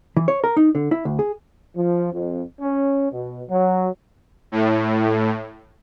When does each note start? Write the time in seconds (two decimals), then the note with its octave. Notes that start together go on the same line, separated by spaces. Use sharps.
0.17 E3
0.28 C#5
0.44 A#4
0.57 D#4
0.75 D3
0.91 E4
1.05 D2
1.19 G#4
1.76 F3
2.13 F2
2.61 C#4
3.12 B2
3.49 F#3
4.52 A2